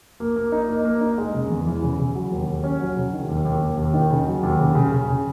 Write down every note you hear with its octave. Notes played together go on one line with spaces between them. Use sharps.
A#3
A#3
D#4
A#3
A#3
D#4
G#3
C#3
E2
E3
C#3
C#3
F#3
D#2
D#2
C#4
F#3
C#3
D#3
D#2
D#2
D#2
D#2
D#3
C#3
F#3
D#2
C#3
C#3
C#3
C#3